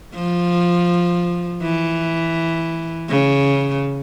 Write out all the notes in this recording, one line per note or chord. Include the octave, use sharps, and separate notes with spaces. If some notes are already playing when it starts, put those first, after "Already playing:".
F3
E3
C#3